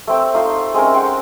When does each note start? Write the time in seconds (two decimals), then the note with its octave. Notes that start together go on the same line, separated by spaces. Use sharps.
0.07 A3 C4 G5
0.34 A3 D#4 F4 C6
0.74 G#3 C4 C#4 A#4
0.94 F#5 G5